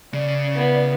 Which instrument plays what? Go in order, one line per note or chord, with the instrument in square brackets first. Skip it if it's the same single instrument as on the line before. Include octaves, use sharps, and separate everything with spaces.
[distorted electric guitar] C#3 [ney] D5
[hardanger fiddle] B3 E4